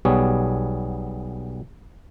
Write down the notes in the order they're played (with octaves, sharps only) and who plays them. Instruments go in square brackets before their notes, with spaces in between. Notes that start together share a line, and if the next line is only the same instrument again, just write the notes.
[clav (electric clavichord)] B1 G3 B3 G#4 C#5